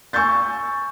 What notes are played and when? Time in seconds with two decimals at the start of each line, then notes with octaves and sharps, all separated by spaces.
0.13 G#5 C#6 E6 G6 A6